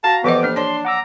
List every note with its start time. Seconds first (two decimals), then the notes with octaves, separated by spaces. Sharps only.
0.04 F#4 F5 A5 A#5
0.24 E3 F3 B3 G4 A4 C5 D#5 D6
0.43 A#3 D4 F6
0.56 D4 C#5 A5 C6
0.85 F#5 A#5 D6 E6